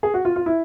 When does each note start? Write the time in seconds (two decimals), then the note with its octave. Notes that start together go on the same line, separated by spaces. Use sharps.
0.03 G#4
0.14 F#4
0.25 F4
0.36 F4
0.46 E4